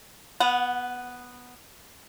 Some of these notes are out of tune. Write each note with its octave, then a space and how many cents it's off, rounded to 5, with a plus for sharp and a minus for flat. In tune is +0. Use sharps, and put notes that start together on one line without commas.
B3 +0 F#5 -30